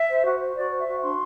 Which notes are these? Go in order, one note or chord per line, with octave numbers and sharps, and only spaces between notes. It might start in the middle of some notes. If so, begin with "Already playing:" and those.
Already playing: E5
C5
F#4
C5
F#4 D5
C5
E5
F#4
D4 C6